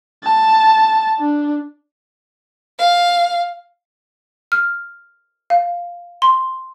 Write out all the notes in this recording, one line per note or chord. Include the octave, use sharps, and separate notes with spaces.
A5
D4
F5
F6
F5
C6